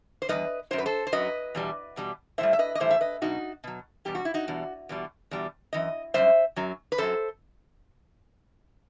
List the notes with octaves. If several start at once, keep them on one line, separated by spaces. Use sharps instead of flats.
C5
E2 D#3 G3 B4 D#5
F#2 F#3 C5
B4
A4 C5
C5
F#2 F#3 B4 D#5
E2 B2 G3
E2 B2 G3
A2 E3 C5 E5
G3
E5
B4 D#5
D#5
A2 E3 G3 C5 E5
E5
B4 D#5
B2 F#3 D#4 F#4
B2 F#3
E2 B2 G3 G4
F#4
E4
D#4 F#4
E2 B2 G3
E2 B2 G3
E2 B2 G3
F#2 E3 D#5
F#2 E3 G3 C5 E5
F#2 F#3
B4
F#2 F#3 A4 C5